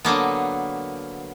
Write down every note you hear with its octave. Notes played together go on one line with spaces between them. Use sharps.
D3 F#3 A#3 B3